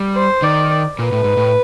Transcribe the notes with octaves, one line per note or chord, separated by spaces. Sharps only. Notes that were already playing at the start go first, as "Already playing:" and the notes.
Already playing: G3
C5
D#3 D5
A#2 B4
A2
G#2
A2